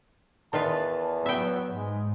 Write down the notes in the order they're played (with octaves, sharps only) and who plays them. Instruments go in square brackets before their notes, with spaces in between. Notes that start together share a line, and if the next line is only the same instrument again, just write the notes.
[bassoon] E2 [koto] D#3 F4 B4 [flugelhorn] A5
[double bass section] F#3 [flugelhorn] B3 [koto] E5 G5
[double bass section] G#2 [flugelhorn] G#3